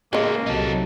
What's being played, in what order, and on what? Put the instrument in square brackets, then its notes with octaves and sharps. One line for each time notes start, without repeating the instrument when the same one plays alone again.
[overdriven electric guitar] A2 C#3 [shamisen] G#3 D#5 [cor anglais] A#3
[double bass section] C2 C3 F#3 [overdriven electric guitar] D#4 A4